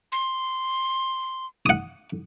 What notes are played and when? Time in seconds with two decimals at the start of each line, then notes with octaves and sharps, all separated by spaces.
0.12 C6
1.66 F#5 D#6